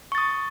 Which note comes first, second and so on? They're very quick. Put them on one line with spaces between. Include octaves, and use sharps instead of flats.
C#6 A6 D#6